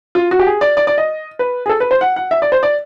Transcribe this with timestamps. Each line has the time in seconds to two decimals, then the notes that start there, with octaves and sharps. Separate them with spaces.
0.15 F4
0.31 F#4
0.39 G4
0.47 G#4
0.61 D5
0.77 D5
0.87 D5
0.98 D#5
1.39 B4
1.66 G#4
1.69 A4
1.80 B4
1.91 C5
2.01 F#5
2.16 F#5
2.31 E5
2.42 D5
2.52 C5
2.63 D5